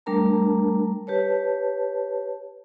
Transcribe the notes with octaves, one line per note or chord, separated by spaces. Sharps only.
G3 A3 D4 A#4 A5 A#5
G4 B4 C#5 A5